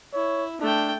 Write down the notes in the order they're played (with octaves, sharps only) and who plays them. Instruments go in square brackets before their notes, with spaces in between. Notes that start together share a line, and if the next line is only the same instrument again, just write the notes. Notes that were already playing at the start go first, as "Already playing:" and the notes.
[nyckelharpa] E4 [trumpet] C#5
[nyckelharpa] A3 G5 [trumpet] D4